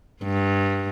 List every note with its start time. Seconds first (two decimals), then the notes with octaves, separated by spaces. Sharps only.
0.23 G2